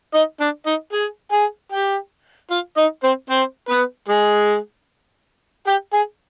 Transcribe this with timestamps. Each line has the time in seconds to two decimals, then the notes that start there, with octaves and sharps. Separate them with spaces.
0.14 D#4 D#5
0.40 D4 D5
0.66 D#4 D#5
0.93 G#4 G#5
1.32 G#4 G#5
1.72 G4 G5
2.50 F4 F5
2.77 D#4 D#5
3.03 C4 C5
3.30 C4 C5
3.69 B3 B4
4.09 G#3 G#4
5.67 G4 G5
5.93 G#4 G#5